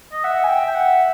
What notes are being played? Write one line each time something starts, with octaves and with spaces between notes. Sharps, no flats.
D#5
E5 F#5
G#5
G5
G5
F#5